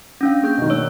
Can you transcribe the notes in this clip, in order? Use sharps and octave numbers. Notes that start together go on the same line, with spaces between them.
C#4 D4 F5
A#3 G#4 G6
B2 D#3
A3 C#5 E6